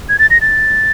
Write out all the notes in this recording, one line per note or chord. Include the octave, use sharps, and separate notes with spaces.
G#6
A6
A#6
A6